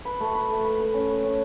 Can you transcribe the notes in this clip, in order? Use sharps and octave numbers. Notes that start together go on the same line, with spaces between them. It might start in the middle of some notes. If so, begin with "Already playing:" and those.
B4
A3
B4
A3
B4
B4
C#4
B4
C#4